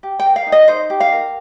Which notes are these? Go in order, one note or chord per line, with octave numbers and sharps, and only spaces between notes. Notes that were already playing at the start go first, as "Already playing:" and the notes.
G4
G5
A#4
F5
D#4
D#5
D#4 C5
G4
F5
A#4